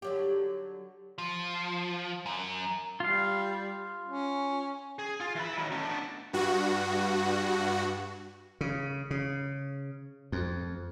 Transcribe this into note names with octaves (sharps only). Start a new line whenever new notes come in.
D3 F#3 G4
F3
F#2
G3 F4 F5
C#4
G#4
F4
E3 B5
D#3 F#3
A3 C#4
B3 D4
G2 F#4
C#3
C#3
F2